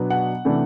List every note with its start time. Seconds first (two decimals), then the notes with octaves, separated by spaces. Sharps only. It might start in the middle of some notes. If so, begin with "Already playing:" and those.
Already playing: B2 F#3 B3 D4
0.10 F#5
0.45 C3 E3 A3 D4